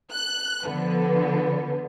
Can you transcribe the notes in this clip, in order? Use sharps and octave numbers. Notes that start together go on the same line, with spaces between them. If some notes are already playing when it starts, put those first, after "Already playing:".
F#6
D3 F3 B3